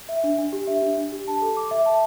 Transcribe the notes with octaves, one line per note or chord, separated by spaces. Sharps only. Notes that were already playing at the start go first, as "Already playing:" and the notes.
E5
D4
D4
G4
E5
D4
D4
G4
A5
A4
D6
E5
A5